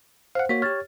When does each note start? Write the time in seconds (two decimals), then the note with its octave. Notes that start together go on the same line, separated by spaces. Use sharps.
0.35 C5 F5 F#5
0.49 A#3 F#4 C#5 B6
0.62 G4 C#5 F6 A6